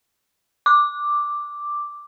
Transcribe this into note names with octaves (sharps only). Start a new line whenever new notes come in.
D6